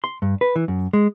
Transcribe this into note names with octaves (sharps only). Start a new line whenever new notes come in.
C6
G2
B4
E3
F#2
G#3